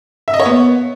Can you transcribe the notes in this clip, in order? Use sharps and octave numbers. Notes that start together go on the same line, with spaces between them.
E5
D#5
C#5
B3